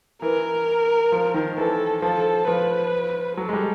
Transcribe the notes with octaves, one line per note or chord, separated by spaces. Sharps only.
E3 A#4
F3
D#3
E3 A4
F3 A4
F3 B4
F#3 A4
G#3
G3